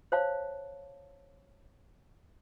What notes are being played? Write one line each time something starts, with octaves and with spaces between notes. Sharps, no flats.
C5 C#5 F5 A5